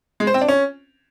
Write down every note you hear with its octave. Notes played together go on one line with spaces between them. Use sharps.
G#3
C5
C4
D4
C#4